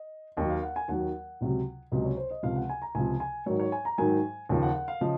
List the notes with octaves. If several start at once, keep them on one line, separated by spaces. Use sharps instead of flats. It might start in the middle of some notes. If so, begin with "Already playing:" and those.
Already playing: D#5
D#2 D#3 F#3 D#5
F5
F#5
G#5
D#2 D#3 F#3 F#5
C#2 C3 F#3
C#2 C3 F#3 D#5
C#5
C5
D#5
C#2 C3 F3 F5
F#5
G#5
A#5
C#2 C3 F3 G#5
G#5
G#2 D#3 F#3 C#5
C#5
G#5
A#5
G#2 D#3 F#3 G#5
D#2 C#3 F3
F#5
F#5
F5
C#3 F3 D#5